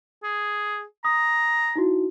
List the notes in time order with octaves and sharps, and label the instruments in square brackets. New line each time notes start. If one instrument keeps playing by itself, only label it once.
[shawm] G#4
[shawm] A#5 [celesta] D#6
[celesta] D#4 E4 F#4